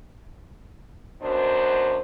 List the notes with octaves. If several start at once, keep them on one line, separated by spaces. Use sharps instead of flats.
F#2 B2 F#3 D4 C5